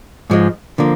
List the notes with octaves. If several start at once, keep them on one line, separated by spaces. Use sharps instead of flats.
G#2 F3 G#3
D3 F3 A#3